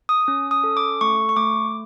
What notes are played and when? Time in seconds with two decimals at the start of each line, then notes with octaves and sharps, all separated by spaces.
0.09 D#6
0.28 C#4
0.51 D#6
0.64 A4
0.77 D6
1.01 A3 C#6
1.29 C#6
1.36 A3 D6